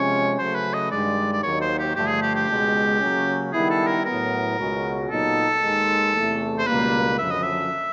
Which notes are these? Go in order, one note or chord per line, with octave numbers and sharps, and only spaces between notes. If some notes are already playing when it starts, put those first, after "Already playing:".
Already playing: C3 F3 G#3 C#4 C#5
C#3 F#3 A3 C5
B4
D#5
G2 D#3 G#3 D5
D5
D#2 D#3 F#3 A#3 D#4 C#5
C5
G4
G2 D3 F3 A3 G4
G#4
G4
G4
C#2 B2 G#3
C#3 F#3 A#3 C#4
D#3 G3 B3 E4 G#4
A4
A#4
A2 F#3 B3 A#4
C#2 B2 G#3 C#4 F#4
A#2 F#3 B3 D#4 A4
D#2 D#3 G#3
E2 C3 E3 A3
C5
C#2 B2 G3 A#3 B4
F#2 D3 F3 E5
D#5
E5